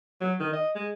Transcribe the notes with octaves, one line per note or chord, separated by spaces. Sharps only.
F#3
D#3
D#5
G#3